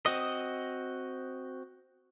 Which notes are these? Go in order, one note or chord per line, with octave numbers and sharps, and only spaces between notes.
C4 F#4 D#5